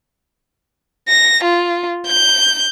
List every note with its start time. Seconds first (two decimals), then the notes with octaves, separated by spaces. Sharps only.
1.08 A#6
1.44 F4
2.07 G6